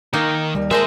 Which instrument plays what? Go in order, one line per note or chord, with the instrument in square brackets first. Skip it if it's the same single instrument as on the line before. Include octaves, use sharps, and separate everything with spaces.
[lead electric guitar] D#3 [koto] A#3 D#4
[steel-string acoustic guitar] D#2 G3
[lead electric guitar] D#2 E5 [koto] G#3 C5 D#5 [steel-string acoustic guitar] A#4 A5